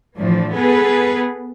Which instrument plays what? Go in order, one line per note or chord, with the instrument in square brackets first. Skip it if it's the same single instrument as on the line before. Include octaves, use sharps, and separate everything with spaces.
[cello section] A2 E3 F3 D4
B3 G#4 A4 B4